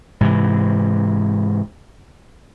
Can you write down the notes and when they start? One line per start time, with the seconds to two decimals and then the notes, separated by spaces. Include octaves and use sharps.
0.21 G#2 C3 E3